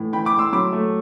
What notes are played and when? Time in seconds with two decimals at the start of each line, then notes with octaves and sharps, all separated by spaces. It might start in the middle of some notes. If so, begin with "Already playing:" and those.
Already playing: A2 E3
0.13 E3 G5 B5
0.25 B5 D6
0.33 A2
0.39 C6 E6
0.53 F#3 B5 D6
0.72 A3